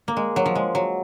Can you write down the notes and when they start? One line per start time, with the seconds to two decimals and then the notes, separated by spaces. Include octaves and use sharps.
0.08 A#3
0.16 G#3
0.36 F#3
0.46 F3
0.55 G#3
0.75 F#3